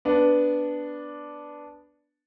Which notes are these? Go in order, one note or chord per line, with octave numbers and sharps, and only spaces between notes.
B3 D4